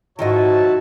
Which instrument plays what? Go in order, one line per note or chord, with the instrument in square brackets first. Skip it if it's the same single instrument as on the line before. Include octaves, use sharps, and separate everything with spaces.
[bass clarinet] G#2 [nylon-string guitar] D#3 F3 D#5 [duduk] F#4 [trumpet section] C#5 E5 A5